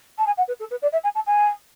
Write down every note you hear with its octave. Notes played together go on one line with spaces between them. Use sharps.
A5
G#5
F#5
B4
A4
B4
D5
E5
G#5
A5
G#5